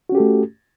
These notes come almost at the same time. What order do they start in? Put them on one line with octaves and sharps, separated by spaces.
F#4 C#4 G4 A4 A3